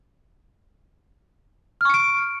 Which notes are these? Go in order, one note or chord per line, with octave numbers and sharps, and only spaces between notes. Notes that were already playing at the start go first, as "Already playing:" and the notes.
C#6 F6 C#7 D7